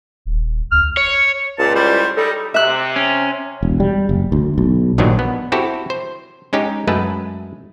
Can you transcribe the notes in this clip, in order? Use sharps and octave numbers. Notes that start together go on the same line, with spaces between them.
D#1
D2 F6
C#5
C#2 A#2 A5
A2 G3 C5
G3 D#4 A4
C3 E5 F#6
C#4
E1
G3
F#1
D2
B1
A#1 G2 A#2 D#3 F#3 D4
B3
C4 E4 F#4 G4 A4
C5
G#3 C#4 D#4 G4
F#2 G#3 A3 B4 A5